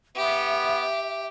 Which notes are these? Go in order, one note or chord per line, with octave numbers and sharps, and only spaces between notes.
B3 G4 E5